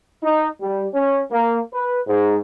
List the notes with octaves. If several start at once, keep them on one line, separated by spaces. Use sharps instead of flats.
D#4
G3
C#4
A#3
B4
G#2